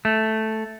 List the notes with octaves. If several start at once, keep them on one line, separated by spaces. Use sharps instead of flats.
A3